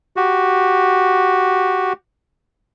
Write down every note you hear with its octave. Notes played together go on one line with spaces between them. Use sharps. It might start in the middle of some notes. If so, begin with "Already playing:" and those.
F#4 G4